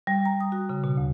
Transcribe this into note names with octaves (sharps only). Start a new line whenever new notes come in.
G3
A#5
D#6
F#4
C#3
B2
D2